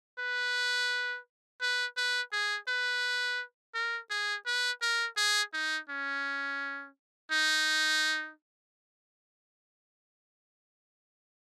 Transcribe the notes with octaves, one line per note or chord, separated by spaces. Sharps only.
B4
B4
B4
G#4
B4
A#4
G#4
B4
A#4
G#4
D#4
C#4
D#4